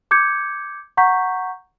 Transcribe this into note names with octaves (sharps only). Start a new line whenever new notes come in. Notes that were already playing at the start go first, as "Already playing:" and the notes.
D6 G6 G#6 C#7
F#5 A#5 C#6 G6 B6